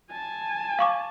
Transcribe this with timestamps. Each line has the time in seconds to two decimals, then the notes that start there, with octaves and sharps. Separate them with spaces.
0.11 G#5 A5
0.79 F5 C#6 D6